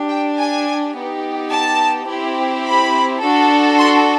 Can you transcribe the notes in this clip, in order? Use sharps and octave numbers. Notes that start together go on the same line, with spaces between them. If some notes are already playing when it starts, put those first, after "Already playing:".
Already playing: D4 G4
G5
G#5
B3 D#4 G4
A5
C4 E4 G4
B5
D4 F#4 A4
C6